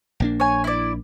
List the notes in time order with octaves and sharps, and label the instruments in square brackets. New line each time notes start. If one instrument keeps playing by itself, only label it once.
[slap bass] A#1 A#3 D4
[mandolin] C#5 G#5
E4 D5